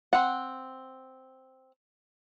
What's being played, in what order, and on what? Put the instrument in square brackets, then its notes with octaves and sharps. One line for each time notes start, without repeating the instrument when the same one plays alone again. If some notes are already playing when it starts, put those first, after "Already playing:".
[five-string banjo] C4 F#5